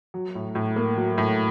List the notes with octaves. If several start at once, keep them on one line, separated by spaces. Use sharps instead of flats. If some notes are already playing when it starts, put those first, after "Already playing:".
F#3
A2
A2
A#3
F#3
A2